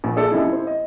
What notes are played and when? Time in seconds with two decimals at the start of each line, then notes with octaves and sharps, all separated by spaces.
0.04 A#1
0.16 D4 G#4 A4 D5
0.31 F#2 C3 D#4 E4
0.48 E4 C5
0.67 D#5